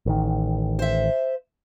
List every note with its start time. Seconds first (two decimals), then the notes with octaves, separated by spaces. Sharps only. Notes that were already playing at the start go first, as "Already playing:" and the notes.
0.06 A1 D#3
0.79 C5 E5